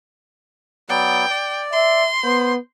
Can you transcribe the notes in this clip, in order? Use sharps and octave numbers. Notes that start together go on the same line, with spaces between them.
F#3 B3 D5 G5
D5
E5 C6
B3 C5